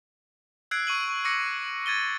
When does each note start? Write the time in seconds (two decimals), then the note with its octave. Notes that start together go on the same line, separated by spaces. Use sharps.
0.71 E6 F#6 G#6 C7 D7
0.87 C#6 D#7 F#7
1.08 C#6
1.25 C#6 D6 E6 A#6 C#7
1.86 G#6 A6 D#7 G7